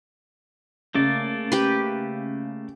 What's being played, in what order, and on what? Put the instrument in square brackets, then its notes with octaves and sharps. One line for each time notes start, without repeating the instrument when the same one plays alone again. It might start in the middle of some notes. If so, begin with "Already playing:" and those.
[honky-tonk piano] C#3 [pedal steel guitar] A3 A#3 D5
[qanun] G4 B4